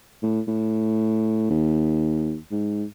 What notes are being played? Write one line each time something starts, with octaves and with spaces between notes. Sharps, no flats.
A2
A2
D#2
G#2